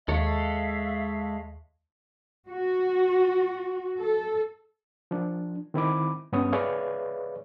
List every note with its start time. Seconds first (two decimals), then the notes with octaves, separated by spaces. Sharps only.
0.08 D#2 G#3 A4 C#5 E5 F5
2.50 F#4
3.99 A4
5.11 F3 D4
5.74 D#3 C4 E4 B5 D6
6.32 G2 B3 C#4 C#5 D#6
6.53 G#4 B4 C#5 D5 E5 F5